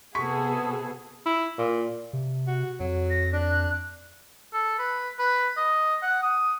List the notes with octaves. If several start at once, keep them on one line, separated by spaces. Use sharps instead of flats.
C3 B3 F#4 G#4 A4 C#6 B6
E4
A#2
C3
F#4
F2 F#3
A#6
D4 F#6
A4
B4
B4
D#5
F#5
D#6